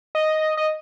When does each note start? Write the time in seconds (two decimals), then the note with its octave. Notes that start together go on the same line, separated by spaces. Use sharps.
0.15 D#5
0.57 D#5